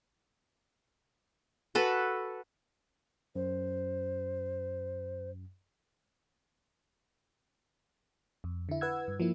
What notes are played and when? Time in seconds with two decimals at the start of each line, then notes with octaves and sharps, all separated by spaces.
1.75 F#4 A4 B4
3.35 F#2 C5
8.44 F2
8.69 D3 E4
8.81 B4 F#5 E6 G#6
9.08 G2
9.20 F3 A#3 E4